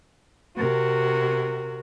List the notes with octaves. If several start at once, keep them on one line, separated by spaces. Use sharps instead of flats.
C3 F#4 A#4